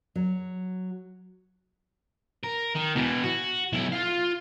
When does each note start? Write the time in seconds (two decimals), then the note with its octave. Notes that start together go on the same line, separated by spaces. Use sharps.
0.16 F#3
2.43 A#4
2.75 D#3
2.95 B2 E3
3.24 F#4
3.73 B1 E4
3.92 F4 F5